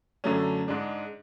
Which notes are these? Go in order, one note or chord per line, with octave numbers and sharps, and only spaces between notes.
F#2 D3 F#3 A3 C#4
G#2 G#3 D4